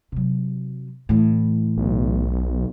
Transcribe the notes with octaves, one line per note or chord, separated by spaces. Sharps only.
C3 F#3
A2 E3
B1